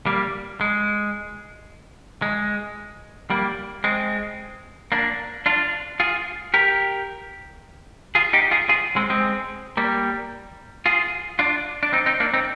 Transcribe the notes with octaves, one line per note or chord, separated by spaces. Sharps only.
G3 A#3
G#3
G#3
G3 A#3
G#3 C4
A#3 D4
D4 F4
F4 G#4
G4 A#4
F4 G#4
D#4 G4
F4 G#4
F4 G#4
G#3 C4
G#3 C4
G3 A#3
F4 G#4
D4 F4
D4
C4 D#4
C4 D#4
A#3 D4
C4 D#4